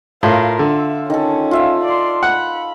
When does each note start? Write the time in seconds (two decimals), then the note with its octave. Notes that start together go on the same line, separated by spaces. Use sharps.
0.23 A2 F4 A#4 F5
0.59 D3 E5
1.10 D#3 C#4 A4
1.51 F4 E5 F5
1.85 D5 C6
2.23 F#5 B5